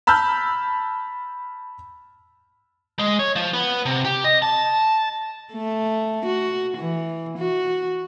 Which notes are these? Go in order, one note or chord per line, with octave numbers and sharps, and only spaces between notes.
A5 B5 E6 F6 G6
G#3
C#5
F3
B3
C3
G4
D#5
A5
A3
F#4
E3
F#4